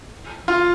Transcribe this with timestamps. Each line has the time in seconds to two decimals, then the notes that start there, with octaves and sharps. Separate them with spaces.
0.48 F4